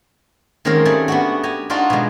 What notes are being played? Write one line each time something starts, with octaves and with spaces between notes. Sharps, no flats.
D#3 G#3 A#3 C4 C#4 A#4
G3 A3 G#4
B3 D4 F#4
G4 G#5 A#5
D4 D#4 F4 F#4 D5
B2 G#3